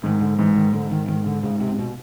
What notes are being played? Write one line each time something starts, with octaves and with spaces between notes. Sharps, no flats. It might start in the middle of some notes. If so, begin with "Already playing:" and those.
G#2 D#3
D3
G#2 E3
D#3
G#2 D3
D#3
G#2 D#3
D3
G#2 C#3
C3
B2